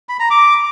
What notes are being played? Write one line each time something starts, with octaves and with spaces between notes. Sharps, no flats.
B5
A#5
D6